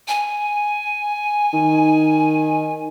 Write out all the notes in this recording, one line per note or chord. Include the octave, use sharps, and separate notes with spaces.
G#5
D#3